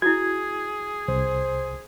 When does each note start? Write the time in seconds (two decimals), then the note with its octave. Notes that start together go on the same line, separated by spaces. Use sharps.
0.02 E4 F#4 G#4 G#6
1.08 C2 C5